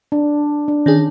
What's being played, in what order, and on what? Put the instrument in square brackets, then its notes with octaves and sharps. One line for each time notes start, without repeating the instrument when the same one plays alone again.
[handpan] D4
D4
[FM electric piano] D#3 D4 G#4 [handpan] C#4